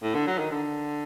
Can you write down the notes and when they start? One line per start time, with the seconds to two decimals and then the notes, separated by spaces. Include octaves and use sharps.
0.03 A2
0.15 D3
0.27 F#3
0.39 D#3
0.51 D3